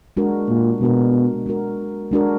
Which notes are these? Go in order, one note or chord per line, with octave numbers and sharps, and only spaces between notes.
G#3 D4 F#4 A#4
A#2
B2 G#3 D4 F#4 A#4
G#3 D4 F#4 A#4
G#3 D4 F#4 A#4